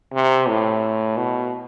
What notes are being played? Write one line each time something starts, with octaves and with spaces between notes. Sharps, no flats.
C3
A2
B2